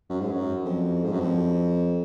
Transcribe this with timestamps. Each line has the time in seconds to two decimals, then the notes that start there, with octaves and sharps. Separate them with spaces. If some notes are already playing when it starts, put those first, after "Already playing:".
0.09 F#2
0.21 G#2
0.31 F#2
0.65 F2
1.04 G#2
1.12 F#2
1.20 F2